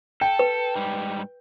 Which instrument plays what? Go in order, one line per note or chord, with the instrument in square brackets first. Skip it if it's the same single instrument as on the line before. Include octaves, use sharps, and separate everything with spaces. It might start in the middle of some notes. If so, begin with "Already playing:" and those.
[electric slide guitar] A4 [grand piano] G5
[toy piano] B4
[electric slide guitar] G#2 G3